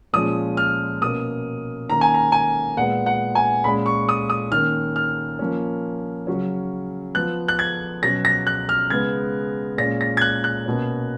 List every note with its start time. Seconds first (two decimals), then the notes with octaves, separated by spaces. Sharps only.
0.13 A#2 F3 G#3 C#4 D#6
0.57 F6
1.01 B2 A#3 C#4 D#6
1.89 D#3 A#3 C#4 A#5
2.01 G#5
2.14 A#5
2.32 G#5
2.77 A#2 G#3 B3 F#5
3.06 F#5
3.35 G#5
3.64 A#2 G#3 C#4 B5
3.86 C#6
4.09 D#6
4.30 D#6
4.52 D#3 A#3 C#4 F6
4.96 F6
5.39 F3 A#3 C#4
6.27 C#3 F#3 C#4
7.15 F3 B3 F#6
7.48 F#6
7.59 G#6
8.03 B2 F#3 C#4 A#6
8.25 A#6
8.47 F#6
8.69 F6
8.90 C#3 G#3 B3 G#6
9.78 A#2 G#3 C#4 A#6
10.01 A#6
10.17 G#6
10.21 F#6
10.44 F#6
10.66 B2 A#3 C#4